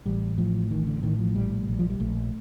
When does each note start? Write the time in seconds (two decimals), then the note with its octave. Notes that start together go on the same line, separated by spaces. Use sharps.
0.06 A1 G3
0.38 A2 F3
0.71 A1 D#3
0.87 D3
1.03 A2 D#3
1.19 F3
1.35 A#1 G3
1.68 A#1
1.79 F3
1.90 G3
2.00 A#1 A3